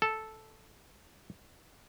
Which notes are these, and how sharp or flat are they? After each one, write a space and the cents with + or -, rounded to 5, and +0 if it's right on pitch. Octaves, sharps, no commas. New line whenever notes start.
A4 -5